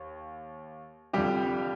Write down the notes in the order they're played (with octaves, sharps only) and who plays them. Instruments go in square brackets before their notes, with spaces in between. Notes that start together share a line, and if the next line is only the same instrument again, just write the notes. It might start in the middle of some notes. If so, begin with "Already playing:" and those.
Already playing: [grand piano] D#2
F1 F2 D3 F3 G3 G4